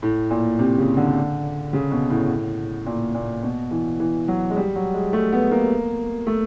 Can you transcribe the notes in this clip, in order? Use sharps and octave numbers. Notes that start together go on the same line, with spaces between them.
A2
A#2
C3
C#3
D3
C#3
B2
A2
A#2
A#2
B2
E3
E3
F#3
G#3
G3
F#3
G#3
A3
B3
A#3
A3